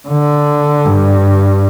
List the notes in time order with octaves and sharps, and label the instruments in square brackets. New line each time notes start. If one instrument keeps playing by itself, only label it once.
[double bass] D3
G2